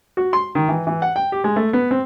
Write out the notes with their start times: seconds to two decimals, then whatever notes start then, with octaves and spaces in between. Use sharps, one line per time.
0.17 F#4
0.33 C6
0.55 D#3
0.69 E3
0.87 E3
1.02 F#5
1.16 G5
1.32 G4
1.44 G#3
1.56 A3
1.73 B3
1.91 C4